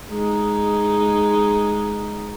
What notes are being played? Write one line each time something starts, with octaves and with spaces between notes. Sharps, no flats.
G#3 D#4